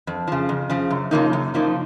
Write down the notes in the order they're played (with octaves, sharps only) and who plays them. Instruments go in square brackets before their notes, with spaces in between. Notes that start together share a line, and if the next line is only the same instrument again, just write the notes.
[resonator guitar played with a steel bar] F2
C#3 F3
F2
C#3 F3
F#2
C#3 F3 A#3 D#4
F#2
C#3 F3 A#3 D#4